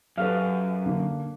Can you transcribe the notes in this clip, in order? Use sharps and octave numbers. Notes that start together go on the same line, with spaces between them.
F#2 G4 A4 B4 F5
D3 A#3